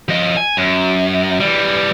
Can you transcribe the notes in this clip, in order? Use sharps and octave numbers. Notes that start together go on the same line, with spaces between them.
F3 D#5
G#5
F#2
E3 G3